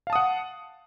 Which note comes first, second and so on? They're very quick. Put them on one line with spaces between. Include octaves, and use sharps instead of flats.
F5 A5 D#6 F#5